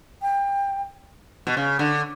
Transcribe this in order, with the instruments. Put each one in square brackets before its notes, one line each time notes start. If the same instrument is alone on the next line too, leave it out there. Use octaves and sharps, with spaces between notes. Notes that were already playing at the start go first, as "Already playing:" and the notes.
[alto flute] G5
[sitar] B2
C#3
D3